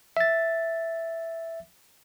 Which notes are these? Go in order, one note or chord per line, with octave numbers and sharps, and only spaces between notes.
E5 A6